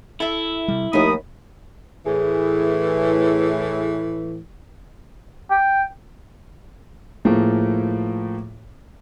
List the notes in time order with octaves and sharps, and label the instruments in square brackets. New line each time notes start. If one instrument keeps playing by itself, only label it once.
[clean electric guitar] E4 [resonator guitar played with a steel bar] A4 E5
[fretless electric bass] C3 G3
[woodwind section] D#2 B5 D#6 [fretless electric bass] F3 A3 A#3 [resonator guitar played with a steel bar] D#4 A#4
[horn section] A2 E3 [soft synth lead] G#4
[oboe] G5
[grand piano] A2 F3 A3 A#3 G#4